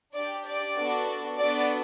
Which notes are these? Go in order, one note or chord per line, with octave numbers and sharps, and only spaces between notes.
D4 G4 D5
D5
B3 D4 F#4 A4
B3 D4 F#4 A4 D5